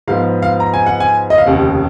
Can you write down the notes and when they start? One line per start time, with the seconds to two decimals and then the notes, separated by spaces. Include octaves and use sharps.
0.07 G#2 F3 B3 F5
0.42 F5
0.60 A#5
0.74 G#5
0.86 F#5
1.00 G#5
1.30 D#5
1.38 F5
1.46 F1 D#2 C#3 F#5